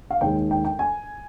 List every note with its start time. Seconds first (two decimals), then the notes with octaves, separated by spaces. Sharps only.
0.10 F5
0.21 D#2 D#3 G#3 G5
0.51 G5
0.65 G5
0.79 G#5